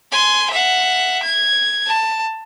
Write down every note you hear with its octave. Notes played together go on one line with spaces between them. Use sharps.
G#5 C6
E5 F#5
G#6
A5